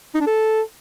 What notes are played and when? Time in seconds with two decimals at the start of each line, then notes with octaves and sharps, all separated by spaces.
0.15 D#4
0.21 D4
0.27 A4